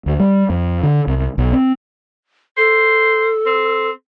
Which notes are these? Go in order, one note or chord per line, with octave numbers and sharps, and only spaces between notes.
D2
G3
F2
D3
C2
B1
C4
A4 C5
C4